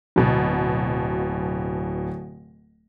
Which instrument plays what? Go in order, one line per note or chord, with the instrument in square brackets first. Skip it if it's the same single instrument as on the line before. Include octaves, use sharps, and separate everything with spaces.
[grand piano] D1 [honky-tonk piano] B2 F#3